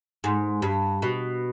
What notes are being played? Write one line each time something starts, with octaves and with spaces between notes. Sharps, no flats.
G#2
G2
B2